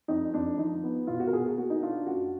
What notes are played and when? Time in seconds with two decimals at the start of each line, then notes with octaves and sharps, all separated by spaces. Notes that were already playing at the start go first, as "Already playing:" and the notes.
0.08 F2 D#4
0.34 F2 D4
0.58 F3 D#4
0.84 B3
1.07 B2 F4
1.20 F#4
1.27 A#4
1.32 B2 G#4
1.46 G#4
1.57 A#3 F#4
1.70 D#4
1.82 D4 F4
2.06 F#2 F#4